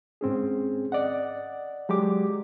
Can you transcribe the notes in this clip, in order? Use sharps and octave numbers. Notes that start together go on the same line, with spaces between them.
G#2 C4 C#4 G#4
D5 D#5 F#5
F#3 G#3 G4 D6